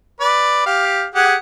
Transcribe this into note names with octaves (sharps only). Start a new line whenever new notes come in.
B4 D5
G4 F5
G4 G#4 F#5